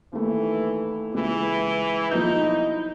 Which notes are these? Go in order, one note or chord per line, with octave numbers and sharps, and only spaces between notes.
D#2 E3 A3
C#2 E3
B1 F3 D#4 G6
E4